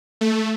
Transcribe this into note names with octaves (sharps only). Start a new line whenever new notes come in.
A3